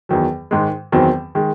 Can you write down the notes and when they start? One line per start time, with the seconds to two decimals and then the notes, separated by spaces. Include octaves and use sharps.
0.09 E2 D#3 F#3
0.51 G#2 D#3 G#3
0.92 E2 D#3 F#3 C4
1.35 D#3 G#3